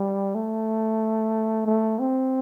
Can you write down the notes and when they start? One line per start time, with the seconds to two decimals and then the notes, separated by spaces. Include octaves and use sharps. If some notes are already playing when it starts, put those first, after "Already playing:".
Already playing: G3
0.35 A3
1.67 A3
2.00 C4